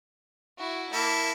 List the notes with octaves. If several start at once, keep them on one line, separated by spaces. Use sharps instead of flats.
E4 F#4
A#3 E4 A5